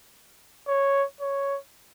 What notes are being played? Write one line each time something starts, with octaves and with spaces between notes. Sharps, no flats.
C#5
C#5